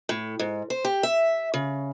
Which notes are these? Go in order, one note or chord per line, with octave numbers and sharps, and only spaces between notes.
A2
G#2
C5
G4
E5
C#3